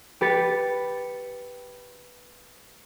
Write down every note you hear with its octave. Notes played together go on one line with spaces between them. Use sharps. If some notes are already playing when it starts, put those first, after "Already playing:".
G4 B4 A6 C#7